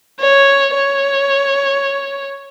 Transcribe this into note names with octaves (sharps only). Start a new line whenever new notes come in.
C#5
C#5